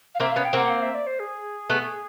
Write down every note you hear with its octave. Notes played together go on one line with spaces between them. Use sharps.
F5
A#3 C4 E5
B3 C#4 F5
G5
A#3 C4 F#5
F#5
F5
E5
D5
C5
G#4
A3 B3